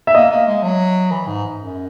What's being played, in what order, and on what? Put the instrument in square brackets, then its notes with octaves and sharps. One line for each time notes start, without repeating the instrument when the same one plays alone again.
[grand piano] E5
[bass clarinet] A#3 [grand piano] D#5
[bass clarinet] A#3
G#3
F#3
E3
G#2
F#2